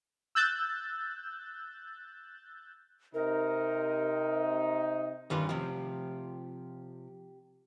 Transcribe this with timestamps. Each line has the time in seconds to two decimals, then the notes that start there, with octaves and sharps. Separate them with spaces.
0.35 E6 F#6 G6 A6
3.14 C3 D#4 A#4
5.30 G2 D#3 G3 C#4 F4 B4
5.49 C3 F3 G4